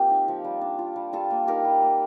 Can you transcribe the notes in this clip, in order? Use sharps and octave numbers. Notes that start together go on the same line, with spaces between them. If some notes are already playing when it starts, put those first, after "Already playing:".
Already playing: A#3 C4 F4 G4
D#4
F3
G3
D4
F4
G3
G3 F4 A4
A#3
D#4 G4 A#4
G3
A#3